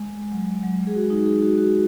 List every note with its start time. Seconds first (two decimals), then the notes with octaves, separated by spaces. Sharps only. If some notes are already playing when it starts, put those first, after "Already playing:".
Already playing: G#3
0.32 F#3
0.63 F#3
0.79 G#3
0.87 G#4
0.95 F#4
1.10 D#4
1.26 G#4
1.42 F#4
1.57 F#4